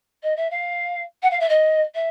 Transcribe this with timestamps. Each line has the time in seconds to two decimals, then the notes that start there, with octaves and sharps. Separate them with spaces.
0.23 D#5
0.36 E5
0.50 F5
1.22 F#5
1.30 F5
1.40 E5
1.49 D#5
1.94 E5